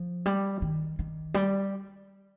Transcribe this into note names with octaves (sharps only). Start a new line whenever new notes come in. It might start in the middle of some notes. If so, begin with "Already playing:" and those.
Already playing: F3
G3
D#3
D#3
G3